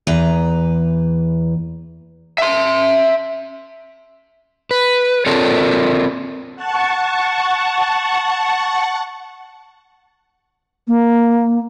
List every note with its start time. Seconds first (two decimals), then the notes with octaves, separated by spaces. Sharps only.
0.07 E2 B4 A#5
2.38 E5 C6
4.71 B4
5.26 C4 F4 A4 A#4 C#5 D5
6.56 F#5 A5 C#6
10.88 A#3